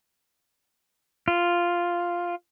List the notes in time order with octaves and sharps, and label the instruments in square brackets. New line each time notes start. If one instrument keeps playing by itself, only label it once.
[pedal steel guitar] F4